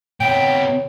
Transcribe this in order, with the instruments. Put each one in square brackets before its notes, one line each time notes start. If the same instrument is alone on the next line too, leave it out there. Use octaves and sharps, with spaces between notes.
[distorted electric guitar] C3 B3 [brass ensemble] C#5 [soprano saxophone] G5